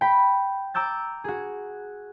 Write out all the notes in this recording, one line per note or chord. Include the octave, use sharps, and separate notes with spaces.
G5 B5
A#5 D6 E6 G6 A6
F#4 G#4